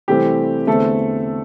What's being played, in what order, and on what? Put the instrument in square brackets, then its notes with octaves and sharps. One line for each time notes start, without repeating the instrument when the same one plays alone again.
[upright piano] C3 E3 A3 C4 [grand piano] G3 G4
[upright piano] E2 D3 C4 [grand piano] A3 A4